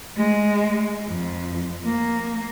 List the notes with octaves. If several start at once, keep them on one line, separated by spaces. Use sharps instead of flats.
G#3
F2
A#3